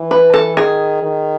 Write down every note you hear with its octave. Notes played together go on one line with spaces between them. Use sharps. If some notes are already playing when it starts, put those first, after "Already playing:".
Already playing: E3
B4
A4
D#3 G#4
D#3